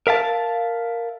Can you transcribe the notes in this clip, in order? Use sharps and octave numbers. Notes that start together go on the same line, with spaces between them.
A#4 E5 F5 A5